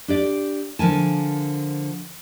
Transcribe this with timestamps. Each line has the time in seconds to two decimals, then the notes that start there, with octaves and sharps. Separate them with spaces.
0.08 D4 G4 D5
0.79 D3 F3 A#4 G#5 A5